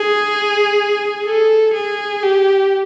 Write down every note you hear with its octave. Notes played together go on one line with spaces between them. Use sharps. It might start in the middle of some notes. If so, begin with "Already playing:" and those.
Already playing: G#4
A4
G#4
G4